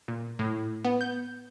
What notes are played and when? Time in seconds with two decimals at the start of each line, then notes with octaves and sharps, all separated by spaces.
0.08 A#2
0.39 A2
0.85 B3
1.01 G6